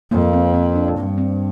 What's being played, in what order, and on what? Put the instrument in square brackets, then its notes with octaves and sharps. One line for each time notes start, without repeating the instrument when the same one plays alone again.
[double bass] F2 [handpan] A#3
[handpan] C4
C4
D4
[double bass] G2
[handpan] C4